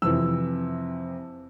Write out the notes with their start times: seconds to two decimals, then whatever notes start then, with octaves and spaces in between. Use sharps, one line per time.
0.02 F2 C3 E3 E6